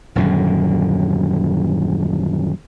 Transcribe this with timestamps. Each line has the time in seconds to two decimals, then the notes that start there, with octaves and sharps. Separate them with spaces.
0.15 D#1 F#2 D3